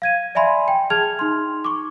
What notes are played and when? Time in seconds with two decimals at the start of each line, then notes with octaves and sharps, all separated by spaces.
0.02 F5 G#6 D#7
0.35 D5 E5 G#5 B5 C6
0.68 G5
0.90 G#4 A5 F6 G#6 F7
1.19 D#4 C6
1.64 C#6 D6